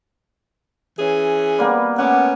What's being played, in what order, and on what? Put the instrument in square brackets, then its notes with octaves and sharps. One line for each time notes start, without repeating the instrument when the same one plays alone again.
[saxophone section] E3 C#4 G#4
[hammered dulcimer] G3 A#3 B3
[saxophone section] A3 B3 C#4 [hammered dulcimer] F#5 D6